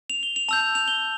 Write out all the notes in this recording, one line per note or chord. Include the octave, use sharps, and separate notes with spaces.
F7
G7
F7
A5 E6 G6 F7
F7
G7